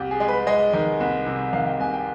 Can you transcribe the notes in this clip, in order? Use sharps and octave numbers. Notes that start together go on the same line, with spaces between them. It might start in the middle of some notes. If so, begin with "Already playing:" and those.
Already playing: C2 G4
G#4
G#3
B4
G#3 D#5
D#3
C2
C3
D#3 F5
G5
C2 G#5
G5